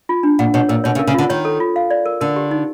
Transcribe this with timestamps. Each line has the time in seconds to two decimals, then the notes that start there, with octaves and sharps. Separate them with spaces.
0.09 F4
0.23 D4
0.39 A#2 F#5
0.54 B2 C#5
0.69 A#2 A#4
0.84 B2 C#5
0.95 C#3
0.99 A#4
1.07 C#3
1.14 D3 F4
1.29 D#3 C#5
1.45 A4
1.60 F4
1.76 F5
1.90 D5
2.06 A#4
2.21 D3 A#4
2.36 G4
2.51 D#4